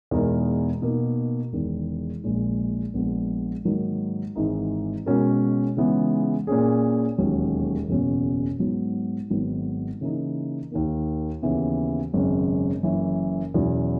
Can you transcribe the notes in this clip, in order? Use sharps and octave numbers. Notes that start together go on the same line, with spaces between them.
E2 B2 G#3 D#4 A#4
B2 A#3 D#4
E1 E2 D#3
A#1 A#2 G#3
A#1 A#2 G#3 B3
G#2 D#3 F#3 A#3 D#4
G#1 G#2 E3 G#3 D#4
B2 G#3 C#4 F#4 A#4
C#3 E3 G#3 B3 D#4
A#2 A#3 C#4 G#4
E1 D#2 D#3 F#3 C#4
F#1 E2 B2 F#3 C#4
G#2 F#3 B3
G#1 G#2 D#3 F#3 B3
C#3 E3 A#3 D#4
D#2 D#3 A#3
D#2 C#3 E3 B3
G#1 F#2 C#3 G#3
F#1 F#2 E3
E2 B2 F#3 C#4 E4